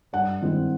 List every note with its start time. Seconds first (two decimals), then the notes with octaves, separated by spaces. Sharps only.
0.13 G2 F#5
0.41 D#3 G#3 C4 E4